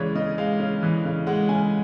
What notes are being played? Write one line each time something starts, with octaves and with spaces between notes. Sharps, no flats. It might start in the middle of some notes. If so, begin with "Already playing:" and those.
Already playing: C#3 E3 G#3 C#5 D5
C#3 D#5
G#3 F5
C#3
E3
C#3
G#3 F#5
C#3 G#5